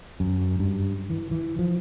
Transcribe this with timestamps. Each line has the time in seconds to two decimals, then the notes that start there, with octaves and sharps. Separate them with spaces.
0.20 F#2
0.59 G2
1.10 E3
1.31 E3
1.59 F3